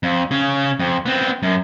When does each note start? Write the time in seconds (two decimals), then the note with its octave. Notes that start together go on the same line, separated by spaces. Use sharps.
0.03 F2
0.31 C#3 C#4
0.79 F2
1.06 B3 C4
1.43 F#2